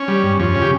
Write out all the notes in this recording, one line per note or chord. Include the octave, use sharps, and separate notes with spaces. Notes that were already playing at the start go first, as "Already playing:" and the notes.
Already playing: C#4
G3
G2
F2 C#4
C#3
G4